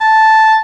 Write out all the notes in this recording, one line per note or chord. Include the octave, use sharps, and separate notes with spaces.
A5